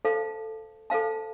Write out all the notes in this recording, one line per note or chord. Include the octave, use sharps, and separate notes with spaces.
A4 C5 F5 A5
A4 C5 F5 A5